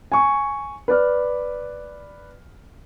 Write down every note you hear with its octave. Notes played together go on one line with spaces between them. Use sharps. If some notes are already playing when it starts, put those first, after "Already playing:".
G#5 C#6
B4 D5 F6